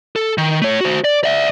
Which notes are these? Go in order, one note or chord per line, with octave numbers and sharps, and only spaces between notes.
A4
D#3
A3 C#5
F#4 C5
D5
D5 E5